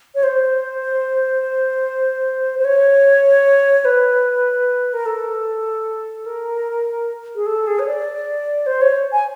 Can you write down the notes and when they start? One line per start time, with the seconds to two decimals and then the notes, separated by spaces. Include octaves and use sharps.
0.15 C#5
0.23 C5
2.59 C5
2.65 C#5
3.85 B4
4.94 A#4
5.06 A4
6.26 A#4
7.35 G#4
7.46 A4
7.67 G#4
7.79 C#5
7.87 D5
8.66 C5
8.81 C#5
9.12 G#5